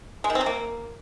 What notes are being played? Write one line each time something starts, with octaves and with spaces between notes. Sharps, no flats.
G#3
D#3
C4
F#3
A#3